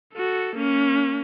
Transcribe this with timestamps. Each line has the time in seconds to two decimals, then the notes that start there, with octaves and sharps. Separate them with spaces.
0.15 F#4 A4
0.56 A#3 C#4